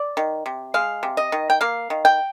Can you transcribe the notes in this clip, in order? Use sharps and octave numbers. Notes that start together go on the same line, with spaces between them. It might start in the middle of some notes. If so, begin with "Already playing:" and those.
Already playing: D5
D#3
C3
G#3 F5
C3
D#5
D#3
G5
A#3 F5
D#3
G5